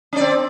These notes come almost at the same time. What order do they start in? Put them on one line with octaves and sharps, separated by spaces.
C#4 D5 C4